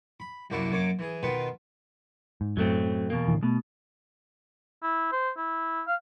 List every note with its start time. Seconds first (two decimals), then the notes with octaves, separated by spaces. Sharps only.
0.20 B5
0.50 C2 F#2 A#3 D4 E4 F#4
0.71 F#2 A#3 C#5 D6
0.99 E3 G#4
1.23 B2 D#3 B3 F4 B4
2.41 G#2
2.57 F#2 A2 F#3 A3 C4
3.10 E2 B2 A#3
3.28 A2 D3 E3
3.43 B2 A3
4.83 E4
5.12 C5
5.37 E4
5.87 F5